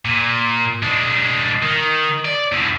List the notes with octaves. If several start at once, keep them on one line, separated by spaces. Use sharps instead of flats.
A#2
G#3 D4
D#3
D5
E2 D3